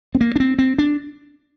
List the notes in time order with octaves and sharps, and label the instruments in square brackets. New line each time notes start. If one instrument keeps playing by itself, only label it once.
[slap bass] C4
A#3
D4
C4
C4
D4